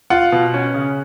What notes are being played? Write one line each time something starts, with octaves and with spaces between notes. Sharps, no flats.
F4 F#5
B2
C#4
C#3